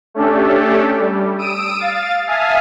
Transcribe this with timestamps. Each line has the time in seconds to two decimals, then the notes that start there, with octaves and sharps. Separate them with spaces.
0.14 A3 C#4 D4 G4 A4
0.99 G3
1.38 D#6 E6 D7 D#7
1.79 F5 A6
2.26 E5 F5 G#5 A5 D#6 F6